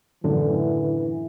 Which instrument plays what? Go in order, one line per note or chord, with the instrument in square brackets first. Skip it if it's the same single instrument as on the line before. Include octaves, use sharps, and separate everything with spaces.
[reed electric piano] F#2 A2 D3 [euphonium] E3